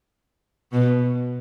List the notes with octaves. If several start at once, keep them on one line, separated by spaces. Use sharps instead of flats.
B2